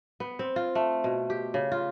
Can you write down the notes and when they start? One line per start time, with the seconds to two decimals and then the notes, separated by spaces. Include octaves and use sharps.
0.20 B3
0.39 C4
0.56 F4
0.75 A3
1.04 B2
1.30 G4
1.54 C#3
1.72 F4